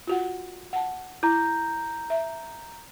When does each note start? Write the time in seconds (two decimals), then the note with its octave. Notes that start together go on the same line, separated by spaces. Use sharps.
0.07 F4 F#4 F#5
0.73 F#5 A5
1.23 E4 A#5 G6
2.10 E5